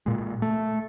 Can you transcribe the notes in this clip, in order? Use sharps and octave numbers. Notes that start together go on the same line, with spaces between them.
A#2 G#3
A3